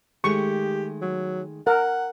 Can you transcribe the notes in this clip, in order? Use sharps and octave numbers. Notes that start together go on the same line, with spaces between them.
D#3 G#3 A3 G4 C#6
F#3
A#4 F#5